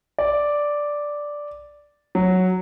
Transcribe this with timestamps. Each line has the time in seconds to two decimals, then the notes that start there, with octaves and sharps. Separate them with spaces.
0.18 D5
2.15 F#3